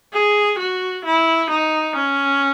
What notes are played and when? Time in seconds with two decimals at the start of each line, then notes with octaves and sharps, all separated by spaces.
0.13 G#4
0.59 F#4
1.05 E4
1.50 D#4
1.96 C#4